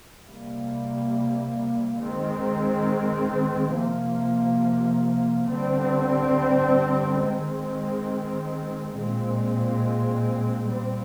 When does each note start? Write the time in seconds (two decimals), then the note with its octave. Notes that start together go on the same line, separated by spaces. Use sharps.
0.25 C3 G3 A#3
1.99 D#3 G#3 C4
3.73 C3 F3 A#3
5.47 D3 G3 C4
7.21 D#3 G#3 C4
8.95 A#2 G#3 C4
10.69 A#2 G3 C4